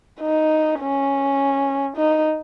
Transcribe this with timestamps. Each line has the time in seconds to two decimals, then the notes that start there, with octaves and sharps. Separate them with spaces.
0.21 D#4
0.80 C#4
1.97 D#4